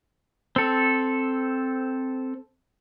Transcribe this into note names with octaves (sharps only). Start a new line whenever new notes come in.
C4 A4